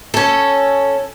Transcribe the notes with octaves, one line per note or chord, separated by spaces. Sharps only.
C#4 A4